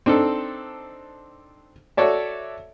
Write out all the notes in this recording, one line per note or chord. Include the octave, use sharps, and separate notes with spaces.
C4 D4 D#4 A4
F#4 A4 C#5 D5 E5